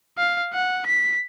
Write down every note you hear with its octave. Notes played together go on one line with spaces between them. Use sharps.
F5
F#5
B6